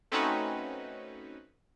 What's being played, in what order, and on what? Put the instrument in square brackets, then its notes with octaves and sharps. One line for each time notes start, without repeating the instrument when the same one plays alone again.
[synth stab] A3 C4 C#4 D#4 F#4 B4